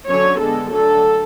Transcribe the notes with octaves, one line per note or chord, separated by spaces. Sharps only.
D3 F#3 C#4 C#5
D3 G#3 B3 A4
D3 F#3 A3 A4